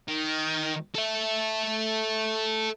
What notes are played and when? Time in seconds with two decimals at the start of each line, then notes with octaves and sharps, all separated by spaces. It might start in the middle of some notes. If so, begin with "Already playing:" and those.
0.08 D#3
0.95 A4 E5